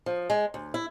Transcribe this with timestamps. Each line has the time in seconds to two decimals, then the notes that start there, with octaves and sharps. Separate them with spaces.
0.06 F3
0.30 G#3
0.54 D2
0.74 E4